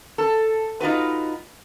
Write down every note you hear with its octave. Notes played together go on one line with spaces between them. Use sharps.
A4
D#4 F4 F#4 B4